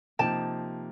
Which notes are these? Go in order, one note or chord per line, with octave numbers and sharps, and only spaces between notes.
C3 F3 A#3 D#4 G5 A5